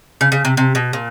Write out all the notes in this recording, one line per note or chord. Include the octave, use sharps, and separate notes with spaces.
C#3
C#3
C3
C3
B2
A#2